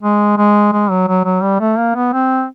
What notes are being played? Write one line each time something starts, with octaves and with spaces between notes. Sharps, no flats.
G#3
G#3
G#3
F#3
F#3
F#3
G3
A3
A#3
B3
C4